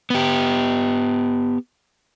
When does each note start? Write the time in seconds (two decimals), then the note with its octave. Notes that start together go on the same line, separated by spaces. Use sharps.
0.10 B3 G4